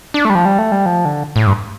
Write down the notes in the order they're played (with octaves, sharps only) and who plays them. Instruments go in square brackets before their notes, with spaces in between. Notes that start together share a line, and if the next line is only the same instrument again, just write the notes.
[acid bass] D4
A3
G3
F3
G3
A3
G3
F3
D3
A2
G2